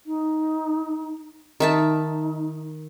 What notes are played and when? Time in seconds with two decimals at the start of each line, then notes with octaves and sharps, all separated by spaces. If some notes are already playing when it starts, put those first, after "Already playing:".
0.06 D#4
1.60 D#3 D#4 E5 A5